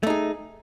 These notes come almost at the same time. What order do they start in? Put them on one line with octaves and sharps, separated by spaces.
A3 D#4 G#4